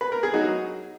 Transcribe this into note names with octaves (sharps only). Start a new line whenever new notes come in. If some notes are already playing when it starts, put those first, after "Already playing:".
B4
A#4
G#4
F#3 D#4 F#4